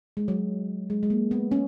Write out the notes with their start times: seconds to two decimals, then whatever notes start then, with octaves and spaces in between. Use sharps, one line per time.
0.17 G#3
0.28 F#3
0.90 G#3
1.03 G#3
1.10 A#3
1.31 B3
1.51 C#4